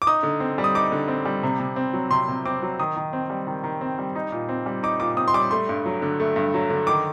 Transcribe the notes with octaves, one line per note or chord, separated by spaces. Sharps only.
D6
D#4 D#6
D3
C4
G3
D#6
D#4 D6
D3
C4
G3
C3
C3
C4
F#3
C3 C6
C3
C4 D6
F#3
D#3 D#6
D#3
C4
G3
D#3
D#3
C4
G3
D#4
A#2
C4
G3
D#4 D6
A#2 D6
C4 D#6
C6
G3 D6
A3 C6
G2
F#3
D3
A3
G2
F#3
D3
D#3 D6